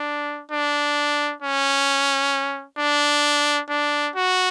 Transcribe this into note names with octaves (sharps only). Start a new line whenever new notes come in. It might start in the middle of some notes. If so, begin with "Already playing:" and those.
Already playing: D4
D4
C#4
D4
D4
F#4